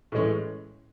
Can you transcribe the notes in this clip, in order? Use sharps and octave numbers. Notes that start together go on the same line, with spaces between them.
A2 E3 G#3 C#4